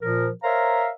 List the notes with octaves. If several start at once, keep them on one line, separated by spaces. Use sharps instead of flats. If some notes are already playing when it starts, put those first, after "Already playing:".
A#2 F3 A#4
A#4 C5 C#5 E5 F5 A#5